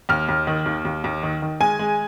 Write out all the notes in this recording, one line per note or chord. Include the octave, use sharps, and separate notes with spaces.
D#2 F6
D#2
D#3
D#2
D#2
D#2
D#3
D#3
G#3 G#5
G#3